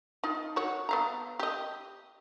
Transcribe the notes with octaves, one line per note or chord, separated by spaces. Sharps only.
D#4 F4
F#4 C#5
B3 F5 A#5
G4 D#5